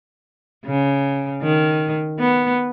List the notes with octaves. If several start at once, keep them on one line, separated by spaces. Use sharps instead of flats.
C#3
D#3
B3